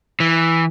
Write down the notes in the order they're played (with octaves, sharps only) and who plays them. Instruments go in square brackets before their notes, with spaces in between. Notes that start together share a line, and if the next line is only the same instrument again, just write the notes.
[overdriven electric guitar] E3